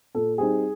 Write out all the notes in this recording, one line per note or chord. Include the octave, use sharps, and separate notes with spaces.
A#2 A4
G3 C4 D#4 G#4